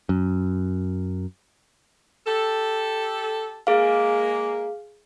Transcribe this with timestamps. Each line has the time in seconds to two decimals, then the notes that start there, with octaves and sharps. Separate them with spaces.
0.09 F#2
2.26 G4 A4
3.67 G#3 A#3 G#4 F5